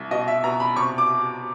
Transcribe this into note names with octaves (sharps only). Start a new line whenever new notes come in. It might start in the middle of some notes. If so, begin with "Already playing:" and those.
Already playing: C2
B2 D#5
E5
B2 A#5
B5
C3 C#6
D6